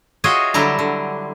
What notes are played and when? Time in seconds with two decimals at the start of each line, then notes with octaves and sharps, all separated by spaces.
0.24 F4 F#4 G#4 C#5 D#5 E5
0.54 D3 F#3 G3 E4 A5 A#5
0.79 D3